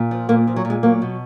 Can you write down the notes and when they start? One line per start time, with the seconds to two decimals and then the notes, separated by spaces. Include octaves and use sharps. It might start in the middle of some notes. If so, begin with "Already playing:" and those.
Already playing: A#2
0.11 F3
0.29 A#2 A#3
0.47 F3
0.56 F#3
0.65 A#2
0.70 G#3
0.83 F#3 A#3
1.02 B2